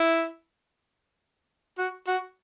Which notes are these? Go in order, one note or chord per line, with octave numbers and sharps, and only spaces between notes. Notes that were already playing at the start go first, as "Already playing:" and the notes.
Already playing: E4
F#4
F#4